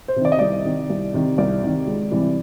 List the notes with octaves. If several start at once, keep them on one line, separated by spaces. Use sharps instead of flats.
C5
C3
D#3 D5
D#5
C2 D5
C3 D#3
C2
C3 D#3
C2 D5
C3 D#3
C#2
C3 E3 G3